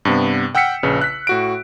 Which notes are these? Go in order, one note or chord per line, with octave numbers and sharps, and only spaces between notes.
G2 C3 B3
F#5 G5 E6 F6 B6 C#7
A#1 C#3 B4
F#6 B6
A2 F#4 D7